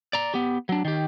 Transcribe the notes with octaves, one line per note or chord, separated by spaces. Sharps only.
D5 A#5
B3 G4
F#3 D4
D#3 G4